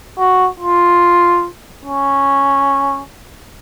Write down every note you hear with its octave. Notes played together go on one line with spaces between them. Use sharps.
F#4
F4
C#4